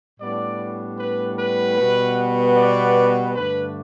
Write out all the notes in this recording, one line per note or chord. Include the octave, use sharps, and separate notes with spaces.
A2 G3 B3 D4 D5
B4
B4
B2 G3 B3
D5
G2 D3 A3 D4 B4